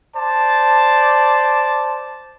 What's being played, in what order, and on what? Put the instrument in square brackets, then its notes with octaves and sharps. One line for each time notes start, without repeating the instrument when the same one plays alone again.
[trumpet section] C5 D5 A5